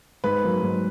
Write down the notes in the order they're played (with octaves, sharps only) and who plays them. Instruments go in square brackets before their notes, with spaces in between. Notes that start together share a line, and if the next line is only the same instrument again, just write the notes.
[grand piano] G#2 B4
F#3 A#3
G#2